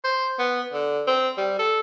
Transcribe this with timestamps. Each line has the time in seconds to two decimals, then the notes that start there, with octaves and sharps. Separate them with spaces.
0.05 C5
0.39 B3
0.73 D3
1.07 C4
1.38 G3
1.59 A4